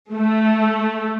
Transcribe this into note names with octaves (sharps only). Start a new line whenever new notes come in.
A3